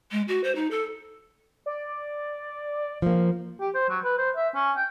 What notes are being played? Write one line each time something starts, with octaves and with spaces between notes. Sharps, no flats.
G#3
F#4
C5
D#4
A4
D5
F3 A#3
G4
C5
F#3
B4
C5
E5
C#4
G5